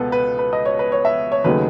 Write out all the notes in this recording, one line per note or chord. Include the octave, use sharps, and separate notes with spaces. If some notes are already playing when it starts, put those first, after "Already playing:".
Already playing: C#2 B2 B3 A4 B4
B4
B4
D#5
C#5
B4
C#5
E5
C#5
D#2 C#3 F#3 A3 D#4 B4